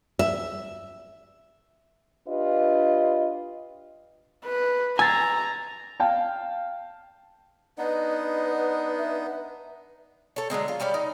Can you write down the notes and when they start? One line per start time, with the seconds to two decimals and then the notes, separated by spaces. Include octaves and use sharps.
0.19 E5
2.28 D4 F4 G4 B4 D#5
4.46 B4
4.99 G#5 A#5 E6 A6 C7
6.00 F5 G5 A5
7.78 B3 D4 D#4 B4 D#5
8.98 E5
10.36 A4 C#5
10.50 D3 F#3 G#3 C4
10.68 F4
10.80 G3 C#4 G4 D5
10.94 D#4